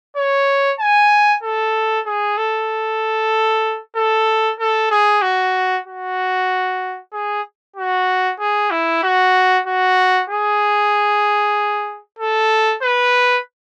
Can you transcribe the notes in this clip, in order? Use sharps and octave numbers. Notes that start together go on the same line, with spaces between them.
C#5
G#5
A4
G#4
A4
A4
A4
G#4
F#4
F#4
G#4
F#4
G#4
E4
F#4
F#4
G#4
A4
B4